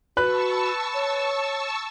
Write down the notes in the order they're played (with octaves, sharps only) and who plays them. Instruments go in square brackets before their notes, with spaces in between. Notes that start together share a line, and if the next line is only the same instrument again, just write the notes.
[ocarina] F#4 [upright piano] B4 B5 F#6 [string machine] A5 C#6 E6
[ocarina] C#5